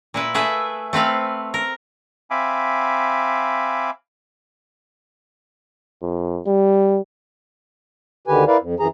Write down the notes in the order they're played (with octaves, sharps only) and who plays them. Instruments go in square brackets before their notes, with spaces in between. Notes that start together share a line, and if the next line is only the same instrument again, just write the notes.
[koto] A#2 E4 B4
A3 G#4 B4 E5
A3 C4 B4 F5
A#4
[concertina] C4 E5 F5 G#5 B5 D6
[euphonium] F2
G3
[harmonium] D2 D3 D#3 G4 B4 G#5
E4 A#4 B4 D5 F5
F2
F#2 E3 G#4 A#5